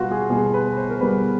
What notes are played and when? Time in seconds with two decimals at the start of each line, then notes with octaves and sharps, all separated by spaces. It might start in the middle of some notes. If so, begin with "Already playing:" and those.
Already playing: B2 G3 B3 F4 F#4
0.12 G#4
0.30 B2 G3 B3 G#4
0.54 B4
0.77 C5
0.90 A#4
1.01 B2 G3 B3 B4